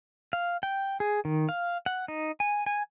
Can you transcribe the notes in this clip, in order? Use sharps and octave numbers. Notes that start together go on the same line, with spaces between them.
F5
G5
G#4
D#3
F5
F#5
D#4
G#5
G#5